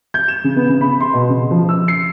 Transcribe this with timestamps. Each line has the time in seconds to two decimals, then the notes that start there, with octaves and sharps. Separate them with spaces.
0.14 G6
0.28 E7
0.44 C#3
0.56 B3
0.69 C#3
0.81 B5
1.00 C6
1.13 B2
1.29 C#3
1.51 F3
1.69 E6
1.88 C7